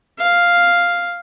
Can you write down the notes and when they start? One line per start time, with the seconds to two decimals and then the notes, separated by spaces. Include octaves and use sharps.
0.19 F5